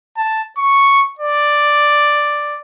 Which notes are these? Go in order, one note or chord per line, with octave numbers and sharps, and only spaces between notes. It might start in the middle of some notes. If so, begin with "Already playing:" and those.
A5
C#6
D5